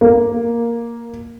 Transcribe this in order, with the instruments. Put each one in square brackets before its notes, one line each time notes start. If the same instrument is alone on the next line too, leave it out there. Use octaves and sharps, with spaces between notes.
[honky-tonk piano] A#3